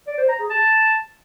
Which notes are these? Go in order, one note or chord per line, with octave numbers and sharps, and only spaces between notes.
D5
C5
A#5
G#4
A5